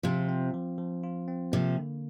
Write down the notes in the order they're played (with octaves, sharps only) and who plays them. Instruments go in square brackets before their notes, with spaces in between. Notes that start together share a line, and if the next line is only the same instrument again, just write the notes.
[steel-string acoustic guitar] C3 F3 [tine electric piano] F4
[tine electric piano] C4
F3
F3
F4
C4
[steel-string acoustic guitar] C3 F3 [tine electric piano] A#3
[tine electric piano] D3